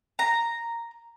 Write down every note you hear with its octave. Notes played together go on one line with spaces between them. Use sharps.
A#5